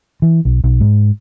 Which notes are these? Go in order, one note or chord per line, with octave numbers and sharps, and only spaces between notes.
E3
B1
B1
G#2